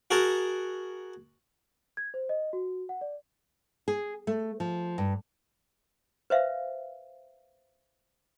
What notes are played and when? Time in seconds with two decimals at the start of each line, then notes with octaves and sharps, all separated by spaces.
0.11 F#4 G#4 A#4 A5 A#5
1.97 G#6
2.14 C5
2.29 D#5
2.53 F#4
2.89 F#5
3.01 D5
3.88 G#4
4.27 A3
4.60 F3
4.98 G2
6.30 B4 C5 E5 F5